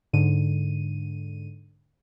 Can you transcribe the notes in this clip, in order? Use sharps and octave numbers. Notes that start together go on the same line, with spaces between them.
G#2 D3 D#7